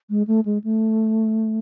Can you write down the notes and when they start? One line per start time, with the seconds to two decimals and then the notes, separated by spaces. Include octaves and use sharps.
0.10 G#3
0.27 A3
0.45 G#3
0.64 A3